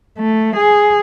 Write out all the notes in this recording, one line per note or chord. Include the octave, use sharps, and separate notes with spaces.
A3
G#4